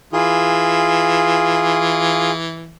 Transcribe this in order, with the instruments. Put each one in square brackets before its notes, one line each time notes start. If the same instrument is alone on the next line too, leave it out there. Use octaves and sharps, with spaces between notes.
[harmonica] E3 [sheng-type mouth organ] F4 G#4